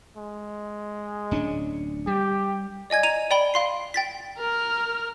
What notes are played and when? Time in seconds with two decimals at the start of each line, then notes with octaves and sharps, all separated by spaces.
0.17 G#3
1.31 D1 C#4 D4
2.07 G3 G4
2.90 D5 D#5 G#5 G#6
3.03 A#5 D#7 F7
3.31 D5 G5 B5 G7
3.54 F5 C6 C7
3.94 G5 A6 B6
4.38 A#4 F6